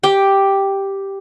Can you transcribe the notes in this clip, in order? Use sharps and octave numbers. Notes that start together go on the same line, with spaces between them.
G4 G5